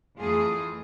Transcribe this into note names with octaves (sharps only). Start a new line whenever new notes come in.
F2 E3 A3 F4 G#4